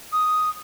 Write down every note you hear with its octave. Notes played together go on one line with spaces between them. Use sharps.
D#6